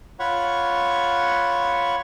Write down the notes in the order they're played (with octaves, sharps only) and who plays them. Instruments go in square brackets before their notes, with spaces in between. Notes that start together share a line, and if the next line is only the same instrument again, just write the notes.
[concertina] F4 C#5 F#5 B5 C#6